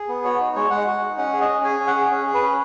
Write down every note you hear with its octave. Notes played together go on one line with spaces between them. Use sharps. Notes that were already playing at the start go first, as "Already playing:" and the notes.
Already playing: G#4
B3
F#4 C#5
D#4
G#3 C#5
G#3 F#5
F#4
D#4
C#4 F#5
G#4
D#5
C#4
G#4 G#5
C#4
F#5
G#4
C#4
G#4
B4
C#4